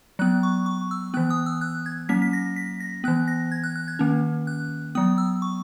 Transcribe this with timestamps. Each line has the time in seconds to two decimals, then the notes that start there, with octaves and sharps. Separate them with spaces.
0.19 F#3 B3 F#6
0.43 C#6
0.66 C#6
0.91 E6
1.14 E3 B3 F#6
1.30 D#6
1.46 E6
1.61 F#6
1.86 G#6
2.09 F#3 A#3 C#4 B6
2.22 B6
2.33 A#6
2.56 B6
2.80 A#6
3.04 E3 B3 F#6
3.28 A#6
3.52 G#6
3.64 F#6
3.76 F#6
3.88 G#6
3.99 D#3 A#3 C#4
4.47 F#6
4.95 F#3 B3 D#6
5.18 E6
5.42 C#6